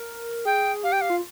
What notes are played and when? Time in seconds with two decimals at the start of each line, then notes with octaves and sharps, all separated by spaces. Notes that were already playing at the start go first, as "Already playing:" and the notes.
Already playing: A#4
0.45 G#4 G5
0.83 G4 F5
0.92 G5
1.01 F5
1.10 F4